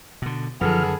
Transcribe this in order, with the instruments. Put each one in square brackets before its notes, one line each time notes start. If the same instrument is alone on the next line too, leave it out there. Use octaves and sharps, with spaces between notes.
[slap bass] B2 D3
[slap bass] F#2 D3 D#3 [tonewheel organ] F3 F6 [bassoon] B3 [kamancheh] G#4 A4